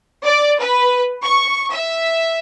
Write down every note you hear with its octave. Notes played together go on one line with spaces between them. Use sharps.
D5
B4
C#6
E5